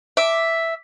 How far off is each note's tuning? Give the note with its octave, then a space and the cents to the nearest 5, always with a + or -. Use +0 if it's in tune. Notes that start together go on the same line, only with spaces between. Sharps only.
E5 +0 D6 +0